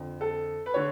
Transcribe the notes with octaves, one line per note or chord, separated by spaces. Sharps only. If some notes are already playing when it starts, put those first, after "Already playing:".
Already playing: F2 D3
A4
B4
D3 C#5